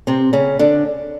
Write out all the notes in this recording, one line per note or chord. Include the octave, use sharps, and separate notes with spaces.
C3 C4
C#3 C#4
D3 D4